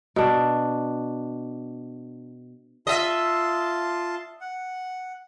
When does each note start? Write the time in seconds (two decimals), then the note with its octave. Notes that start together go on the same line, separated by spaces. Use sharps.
0.16 B2 D4
2.87 F4 D#5 E5 A5 C6
4.41 F#5